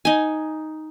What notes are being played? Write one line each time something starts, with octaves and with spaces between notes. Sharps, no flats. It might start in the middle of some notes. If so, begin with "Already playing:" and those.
D#4 G#5